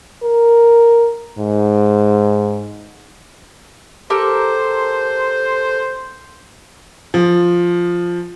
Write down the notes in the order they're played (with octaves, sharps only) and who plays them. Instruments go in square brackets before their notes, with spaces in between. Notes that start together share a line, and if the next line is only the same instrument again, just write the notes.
[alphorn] A#4
G#2
[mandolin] G4 A4 A#4 [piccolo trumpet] C5
[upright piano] F3